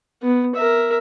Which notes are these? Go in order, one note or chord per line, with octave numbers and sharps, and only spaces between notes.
B3
A#4 E5